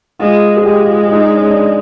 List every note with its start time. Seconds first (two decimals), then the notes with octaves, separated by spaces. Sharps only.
0.19 G#3 F4
0.57 G#4
0.65 G#3 G4
0.80 F4
0.96 G4
1.11 D#4
1.25 D4
1.37 C#4
1.50 D4